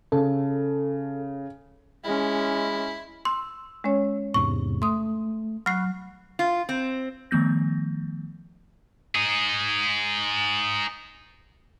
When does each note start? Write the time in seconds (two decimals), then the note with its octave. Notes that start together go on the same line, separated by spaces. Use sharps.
0.12 C#3 A4
2.04 G#3 C#4 E4
3.25 C6 E6
3.84 G#3 C#4 C#5
4.34 E2 G#2 C3 C#6
4.82 A3 C6 D#6
5.66 F#3 B5 C#6 F6 F#6 C7
6.39 F4
6.69 C4
7.31 D#3 F3 A3 B3 G6 A#6
9.15 D#4 G#4